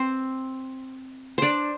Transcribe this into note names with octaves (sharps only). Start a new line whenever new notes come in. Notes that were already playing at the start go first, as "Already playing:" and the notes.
Already playing: C4 C5
D4 C5 D5